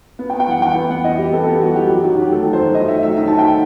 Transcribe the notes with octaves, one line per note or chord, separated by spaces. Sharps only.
B3
G5
B3
G5
E3 F#5
E3 G5
B3 G5
B3 F#5
E3 D#5
E3 G4
B3 A4
B3 G4
E3 F#4
E3 G4
F#3 G4
D#3 F#4
D#3 G4
A3 A4
F#3
C5
D#3
D#3 D#5
A3 E5
F#3 E5
D#3 E5
D#3 A5
G5
A3 F#5